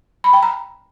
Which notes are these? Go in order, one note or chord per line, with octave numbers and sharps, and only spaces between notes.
B5
G5
A#5